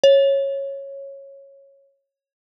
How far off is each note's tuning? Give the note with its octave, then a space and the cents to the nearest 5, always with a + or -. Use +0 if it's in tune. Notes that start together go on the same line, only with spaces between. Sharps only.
C#5 -10